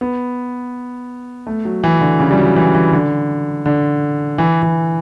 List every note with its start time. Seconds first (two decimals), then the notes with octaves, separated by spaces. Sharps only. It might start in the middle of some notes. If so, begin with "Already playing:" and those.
0.01 B3
1.47 A3
1.65 F#3
1.84 E3
2.01 D3
2.20 C#3
2.31 G3
2.37 F#3
2.56 E3
2.75 E3
2.93 D3
3.66 D3
4.38 E3
4.63 E3